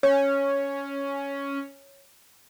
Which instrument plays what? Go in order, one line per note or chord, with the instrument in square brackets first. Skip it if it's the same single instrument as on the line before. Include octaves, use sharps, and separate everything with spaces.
[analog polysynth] C#4 [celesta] C#5